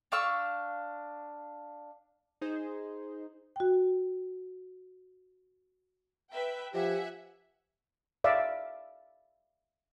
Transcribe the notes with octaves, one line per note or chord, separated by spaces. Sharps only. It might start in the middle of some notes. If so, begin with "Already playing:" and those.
D4 F5 C#6 E6
D#4 G#4 C5
F#4 G5
B4 E5 G5
F3 G4 E5 F#5 G#5
D5 E5 F5